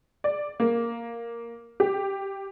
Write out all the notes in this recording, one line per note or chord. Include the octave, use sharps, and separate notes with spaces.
D5
A#3
G4